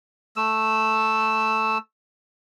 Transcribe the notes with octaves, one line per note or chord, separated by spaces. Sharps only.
A3 E6